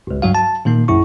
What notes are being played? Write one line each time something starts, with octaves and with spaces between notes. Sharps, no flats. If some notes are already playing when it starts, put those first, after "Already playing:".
G#1 C#2
G2 F#3 F#4 F5
A5
A#2 D#3 A#3 D#4
A#1 F#2 E4 C#6